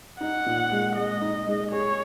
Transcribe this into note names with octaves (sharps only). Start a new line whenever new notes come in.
D#4 F#5
A#2
G#3
G#3 D#5
D#4
G#3
G#4 C#5